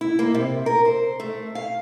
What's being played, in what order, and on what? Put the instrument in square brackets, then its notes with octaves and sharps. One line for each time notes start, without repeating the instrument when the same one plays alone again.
[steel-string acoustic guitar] E4
A#3
C3
A#4
C5
A3
F5